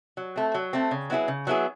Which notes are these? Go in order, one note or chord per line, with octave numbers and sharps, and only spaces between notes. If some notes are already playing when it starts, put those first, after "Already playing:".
F#3
A3 C4
F#3
A3 C4
C#3
F#3 B3 E4 G#4
C#3
F#3 B3 E4 G#4